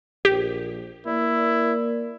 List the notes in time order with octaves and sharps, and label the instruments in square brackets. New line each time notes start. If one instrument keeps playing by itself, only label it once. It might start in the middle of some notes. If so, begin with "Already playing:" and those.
[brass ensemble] A#1 [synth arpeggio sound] G4
[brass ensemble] A#3 A#4 D5 [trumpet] E4